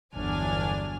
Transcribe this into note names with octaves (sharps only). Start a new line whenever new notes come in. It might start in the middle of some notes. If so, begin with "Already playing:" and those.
G1 E2 F#3 D4 G#5 F6